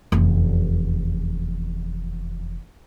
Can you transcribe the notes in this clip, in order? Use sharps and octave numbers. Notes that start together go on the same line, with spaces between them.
F1 E2